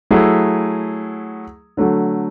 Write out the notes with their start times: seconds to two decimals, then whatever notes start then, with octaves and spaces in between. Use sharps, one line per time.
0.11 F#3 A3 E4 G#4
1.77 D3 F#3 A3